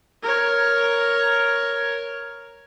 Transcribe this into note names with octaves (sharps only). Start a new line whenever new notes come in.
A#4 C#5